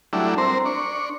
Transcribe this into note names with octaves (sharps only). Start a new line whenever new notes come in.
F#3 G3 A3 D4 E4
C4 A#4 C5
D4 C#6